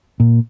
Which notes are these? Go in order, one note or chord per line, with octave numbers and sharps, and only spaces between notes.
A#2